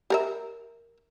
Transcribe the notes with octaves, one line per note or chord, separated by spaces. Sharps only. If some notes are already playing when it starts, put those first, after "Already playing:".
G4 A#4 E5